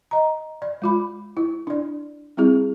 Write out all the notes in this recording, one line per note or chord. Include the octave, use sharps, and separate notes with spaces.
D#5 A#5
D5
G#3 F4 B5
E4
D4 D5
G3 C4 E4 G#4